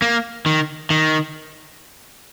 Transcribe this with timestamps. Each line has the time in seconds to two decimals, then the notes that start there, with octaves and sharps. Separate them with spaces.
0.02 A#3
0.46 D#3
0.90 D#3